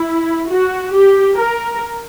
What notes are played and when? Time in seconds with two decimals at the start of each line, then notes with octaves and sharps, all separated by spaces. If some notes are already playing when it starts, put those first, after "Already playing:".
Already playing: E4
0.48 F#4
0.93 G4
1.38 A#4